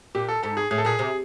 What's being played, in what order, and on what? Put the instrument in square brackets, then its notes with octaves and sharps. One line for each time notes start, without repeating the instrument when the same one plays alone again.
[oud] A#2 [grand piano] G4
[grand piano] A4
[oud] G#2 [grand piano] A4
[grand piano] G#4
[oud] A2 [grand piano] G#4
[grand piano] A4
[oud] A#2 [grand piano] G#4
[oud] C3